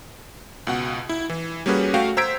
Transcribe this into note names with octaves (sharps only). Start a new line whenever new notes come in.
C#2 B2 F#5
E4
E3
G3 A#3 C#4 F#4 G#4 B4
A3 F#4 F5 G5
C5 A#5 E6 G#6 B6 D7